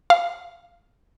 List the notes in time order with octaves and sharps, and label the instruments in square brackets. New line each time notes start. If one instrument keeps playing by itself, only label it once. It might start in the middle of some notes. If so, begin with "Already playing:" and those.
[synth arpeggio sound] F5